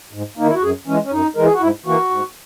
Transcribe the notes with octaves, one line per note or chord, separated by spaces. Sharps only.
G#2
D#3 A#3 D#4
E4
F#4
F#2 G#4
E3 G#3 C#4
C#4
F#2 D#4
E3 G#3 A#4
G#4
F#4
G#2 E4
E3 A#3 F#4
G#2